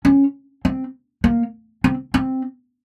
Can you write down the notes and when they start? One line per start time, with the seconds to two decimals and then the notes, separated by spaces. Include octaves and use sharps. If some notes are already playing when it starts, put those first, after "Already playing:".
0.05 C#4
0.65 C4
1.24 A#3
1.84 C4
2.14 C4